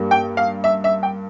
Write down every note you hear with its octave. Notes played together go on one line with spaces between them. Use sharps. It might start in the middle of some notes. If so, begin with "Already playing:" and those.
Already playing: G2 G3 A#3
G5
F5
E5
E5
G5